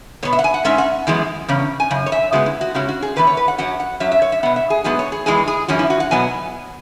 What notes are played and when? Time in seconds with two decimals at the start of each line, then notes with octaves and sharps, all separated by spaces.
0.23 B2 B3 C#5
0.33 E5
0.39 F#5
0.44 G#5
0.54 F#5
0.64 G#2 G#3 C#4 E5
0.78 F#5
1.07 F#2 E3 G#3 B3
1.48 E2 C#3 C#4
1.80 G#5
1.91 F#2 C#3
2.06 C#5
2.12 E5
2.32 C#3 G#3 B3 F#4
2.46 E4
2.61 F#4
2.75 C#3 G#3 C#4 F#4
2.89 F#4
3.02 G#4
3.16 E2 E3 B3 B4
3.27 C#5
3.37 B4
3.48 F#5
3.58 F#2 F#3 C#4 F#5
3.80 F#5
4.00 F#2 F#3 C#4 E5
4.12 E5
4.22 C#5
4.32 E5
4.43 B2 B3 F#5
4.56 E5
4.70 G#4
4.84 G#2 F#3 B3 G#4
4.99 C#5
5.12 G#4
5.26 E2 E3 G#3 G#4
5.48 G#4
5.68 F#2 E3 C#4 F#4
5.79 E4
5.90 F#4
6.00 F#5
6.11 B2 F#3 B3 G#5